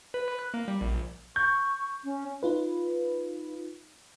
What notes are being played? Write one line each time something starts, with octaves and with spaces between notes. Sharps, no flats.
B4
F#6
A#3
G3
A#1
C#6 G6
C#4
D#4 F4 B4